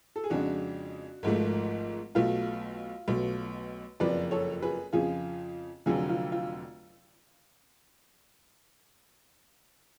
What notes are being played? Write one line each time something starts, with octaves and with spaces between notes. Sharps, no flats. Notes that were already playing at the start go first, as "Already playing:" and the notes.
A4
G#4
F2 C#3 G#3 D4 F#4
G#1 G#2 F3 A3
B1 B2 A3 F4
B1 B2 A3
F#1 F2 F3 B4 D5
A4 C#5
G#4 B4
F2 C#3 F3 F4 G#4
F1 F2 D3 F#3 F4 G#4
F4
F4